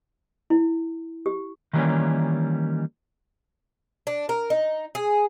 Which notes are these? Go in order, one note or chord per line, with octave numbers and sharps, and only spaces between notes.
E4
G4
D#3 E3 G3 A#3 C#4
D4
A#4
D#4
G#4